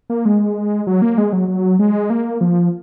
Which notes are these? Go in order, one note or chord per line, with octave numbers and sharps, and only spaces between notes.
A#3
G#3
F#3
A#3
G#3
F#3
F#3
G#3
A#3
F3